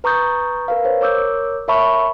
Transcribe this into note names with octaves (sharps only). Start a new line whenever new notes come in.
B4 A#5 C#6 D#6 G6 A6
A#4 B4 F5
A#4 C5 C#5
A#4 C#5 D6 E6 G6
A#4 C#5 E5 A5 B5 C#6